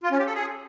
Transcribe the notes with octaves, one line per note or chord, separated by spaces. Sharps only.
F4
C#4
G4
A4
G#4